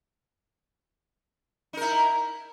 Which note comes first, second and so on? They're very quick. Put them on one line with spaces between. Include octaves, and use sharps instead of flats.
D#4 A#4 E4